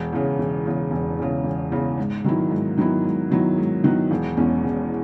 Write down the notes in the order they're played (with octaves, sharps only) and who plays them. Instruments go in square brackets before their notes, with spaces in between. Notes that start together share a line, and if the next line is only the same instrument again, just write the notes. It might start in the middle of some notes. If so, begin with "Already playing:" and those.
Already playing: [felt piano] E1
E2 C#3
E1
E2 C#3
E1
E2 C#3
E1
E2 C#3
G#2
D#3 F#3 B3 E4
G#2
D#3 F#3 B3 E4
G#2
D#3 F#3 B3 E4
G#2
D#3 F#3 B3 E4
E1
E2 B2 G#3 C#4
E1